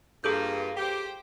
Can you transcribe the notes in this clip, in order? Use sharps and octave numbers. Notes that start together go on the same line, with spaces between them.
G2 A#3 F4 G#4 A4 G6
G4 C5 G5